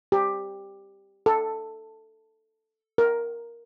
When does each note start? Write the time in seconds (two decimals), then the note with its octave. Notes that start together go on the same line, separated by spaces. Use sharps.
0.12 G4
1.26 A4
2.98 A#4